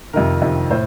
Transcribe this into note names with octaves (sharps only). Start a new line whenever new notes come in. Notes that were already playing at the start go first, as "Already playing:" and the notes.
F2 C3 D#3 A#4
F2 C3 D#3
A2 C5